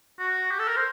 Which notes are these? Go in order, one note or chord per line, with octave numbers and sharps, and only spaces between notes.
F#4
G4
A4
A#4
C5